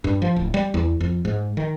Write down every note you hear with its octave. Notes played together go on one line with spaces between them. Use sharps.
G2
F3
D1
G3
E2
F2
G#2
D#3